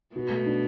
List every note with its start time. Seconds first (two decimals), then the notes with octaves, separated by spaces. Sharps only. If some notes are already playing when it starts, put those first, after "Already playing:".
0.15 B2 F#4
0.30 A3
0.46 D4